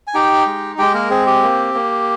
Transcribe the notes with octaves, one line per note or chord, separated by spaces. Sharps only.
G#5
D#4 G4 G5
G#3
G#3 G4 G5
A#3 A#4
C4 G#4
G4
A#3
A#3